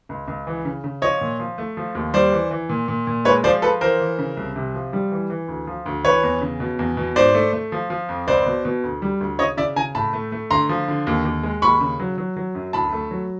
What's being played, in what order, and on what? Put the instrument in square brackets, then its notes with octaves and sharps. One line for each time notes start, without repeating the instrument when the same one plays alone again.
[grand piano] C#2
C#2
E3
C#3
C#3
F3 C#5 D#5
A#2
F3
A3
F3
D#2
G3 C5 D5
E3
E3
A#2
A#2
A#2
G#3 B4 C#5
F3 C5 D5
F3 A4 B4
E3 A#4 C5
E3
C#3
C2
C3
F3
G3
E3
E3
D2
F3
D2
E3 B4 C#5
E2
C#3
B2
E2
B2
G#2 C5 D5
A3
A3
F3
F3
F2
C#2 C5 D5
B2
B2
D2
G3
D2
C#3 C#5 D#5
C#3 D5 E5
C#3 G#5 A#5
A2 A5 B5
A3
A3
D3 A#5 C6
F3
D3
D#2
D#2
G#3
D#2 B5 C#6
C#3
F#3
F#3
F#3
F#2
D2 A5 B5
A3
F#3